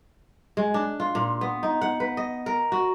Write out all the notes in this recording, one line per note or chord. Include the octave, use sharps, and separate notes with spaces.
G#3
D4
F4
A#2
B3
D#4
F#5
B4
D#5
A#4
F#4